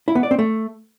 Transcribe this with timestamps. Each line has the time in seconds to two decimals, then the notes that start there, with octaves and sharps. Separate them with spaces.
0.08 E4
0.15 B3
0.23 D5
0.31 C4
0.39 A3